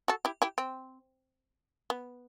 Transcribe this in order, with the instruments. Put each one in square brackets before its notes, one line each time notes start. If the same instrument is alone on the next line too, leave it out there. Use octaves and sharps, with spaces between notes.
[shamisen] F#4 A4
E4 G4
E4 G4
C4
B3